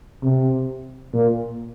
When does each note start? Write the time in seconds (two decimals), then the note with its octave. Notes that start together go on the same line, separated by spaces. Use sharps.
0.22 C3
1.13 A#2